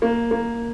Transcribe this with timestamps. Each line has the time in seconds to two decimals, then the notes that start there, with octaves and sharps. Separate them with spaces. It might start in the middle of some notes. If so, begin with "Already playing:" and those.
0.02 A#3
0.31 A#3